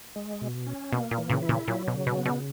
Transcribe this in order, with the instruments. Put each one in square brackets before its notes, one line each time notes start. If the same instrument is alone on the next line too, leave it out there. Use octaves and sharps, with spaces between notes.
[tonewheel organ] G#3
B2
C#4
[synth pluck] B2 [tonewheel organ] A#3
[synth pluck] A#2
[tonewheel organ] E3
[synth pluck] A#2 C#3
[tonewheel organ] E4
[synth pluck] A#2 C#3
[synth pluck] A#2 [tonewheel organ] F#3
[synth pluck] B2
[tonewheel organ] C#3
[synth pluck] B2
[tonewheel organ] B3
[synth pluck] B2